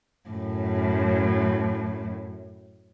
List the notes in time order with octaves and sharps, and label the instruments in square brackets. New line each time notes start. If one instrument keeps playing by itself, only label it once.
[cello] F#2 A2